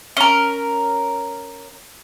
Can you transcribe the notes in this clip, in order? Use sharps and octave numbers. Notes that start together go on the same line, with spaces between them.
C#4 A#4